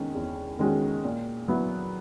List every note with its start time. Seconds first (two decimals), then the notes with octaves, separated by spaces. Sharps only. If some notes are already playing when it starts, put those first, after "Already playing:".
Already playing: E2 D#3 G#3 C#4
0.15 E2
0.59 D#3 G#3 C#4 F#4
1.04 A#2
1.48 F#3 B3 E4